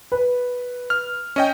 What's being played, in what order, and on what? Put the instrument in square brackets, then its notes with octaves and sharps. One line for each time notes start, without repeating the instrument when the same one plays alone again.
[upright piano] B4
[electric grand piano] F6
C#4 D#5 G5